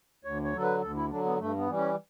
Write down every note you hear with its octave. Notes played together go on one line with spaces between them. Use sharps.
D2 C#5
C#5
D3 F#3 A4
B4
D2 A4
E4
D3 F#3 D4
B3
G2 A3
B3
E3 G3
C#4